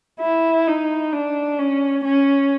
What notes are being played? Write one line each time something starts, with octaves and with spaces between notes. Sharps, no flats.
E4
D#4
D4
C#4
C#4